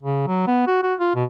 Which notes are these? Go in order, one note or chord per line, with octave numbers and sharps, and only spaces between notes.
C#3
F#3
B3
F#4
F#4
F4
B2